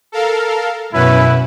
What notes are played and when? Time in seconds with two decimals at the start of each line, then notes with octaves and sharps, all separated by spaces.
0.12 A4 A#4 F5
0.93 F#2 B2 C#4 E4 B4